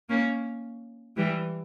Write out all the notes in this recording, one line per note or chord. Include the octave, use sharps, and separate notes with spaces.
A#3 C#4
E3 G3